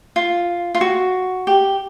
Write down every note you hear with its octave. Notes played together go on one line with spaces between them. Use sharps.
F4
F4
F#4
G4